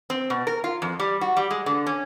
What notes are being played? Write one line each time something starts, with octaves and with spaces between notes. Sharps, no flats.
C4
B2
A#4
F4
F2
G3
F#4
G3
G#3
D3
C#4